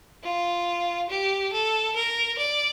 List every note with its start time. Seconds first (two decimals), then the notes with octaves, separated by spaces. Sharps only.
0.23 F4
1.09 G4
1.52 A4
1.95 A#4
2.38 D5